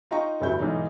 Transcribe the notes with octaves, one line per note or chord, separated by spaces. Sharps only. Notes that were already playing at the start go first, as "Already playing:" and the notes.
D#4 F4 D#5 G5 A#5 C#6
F1 D2 G2 E4 F#4 G6
B1 G#2 E3 D#4 D5